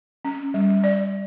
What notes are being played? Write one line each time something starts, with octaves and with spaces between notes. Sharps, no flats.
C#4
G3
D5